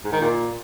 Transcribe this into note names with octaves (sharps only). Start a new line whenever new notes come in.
G#2
D#3
A#2